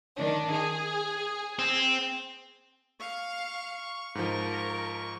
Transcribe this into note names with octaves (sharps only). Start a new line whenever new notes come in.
D#3 D4
G#4
C4
F5 C#6
G#2 F3 A#4